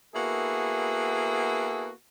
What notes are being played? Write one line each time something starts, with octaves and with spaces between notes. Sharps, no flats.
A#3 B3 E4 F#4 G#4 A4